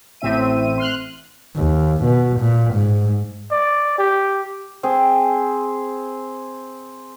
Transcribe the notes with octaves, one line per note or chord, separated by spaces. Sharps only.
A1 A2 C4 E5 D#7
C6 F6 F#6
D#2
B2
A#2
G#2
D5
G4
C4 G#4